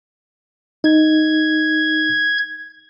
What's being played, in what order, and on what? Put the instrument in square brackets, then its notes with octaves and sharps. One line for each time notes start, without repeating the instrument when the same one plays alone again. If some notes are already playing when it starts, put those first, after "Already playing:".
[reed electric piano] D#4 [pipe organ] G#6